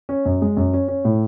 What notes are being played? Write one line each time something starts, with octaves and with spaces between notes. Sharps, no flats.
C#4
F#2
G#3
F#2
C#4
C#4
A2